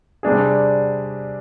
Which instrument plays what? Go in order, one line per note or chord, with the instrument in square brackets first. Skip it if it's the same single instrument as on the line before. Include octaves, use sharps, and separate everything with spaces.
[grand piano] C3 G3 D4 G#4